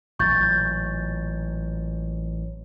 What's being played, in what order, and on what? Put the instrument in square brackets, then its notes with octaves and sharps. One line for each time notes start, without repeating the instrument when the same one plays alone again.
[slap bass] A1 A#2 F#3 [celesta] C#6 G6 A6